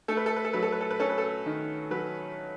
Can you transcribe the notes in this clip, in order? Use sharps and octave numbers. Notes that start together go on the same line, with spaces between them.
A3 A4
B4
A4
B4
A4
F#3 B4
A4
B4
A4
B4
C#4 A4
B4
A4
D#3
F#3 B4